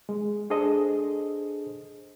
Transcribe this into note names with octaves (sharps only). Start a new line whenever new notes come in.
G#3
D4 G#4 A4 C5 D#5